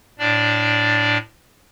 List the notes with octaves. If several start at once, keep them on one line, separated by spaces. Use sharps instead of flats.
A2 D4 D5